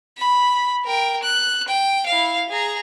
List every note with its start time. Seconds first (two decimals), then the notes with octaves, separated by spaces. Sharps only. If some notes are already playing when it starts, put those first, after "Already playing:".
0.17 B5
0.84 A#4 G5
1.22 F#6
1.68 G5
2.06 E4 F5
2.49 G#4 A#5